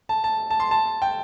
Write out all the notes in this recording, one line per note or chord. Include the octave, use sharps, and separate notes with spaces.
A5
A5
A5
C6
A5
G5